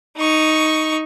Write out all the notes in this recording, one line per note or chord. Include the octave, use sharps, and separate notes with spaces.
D#4 C#6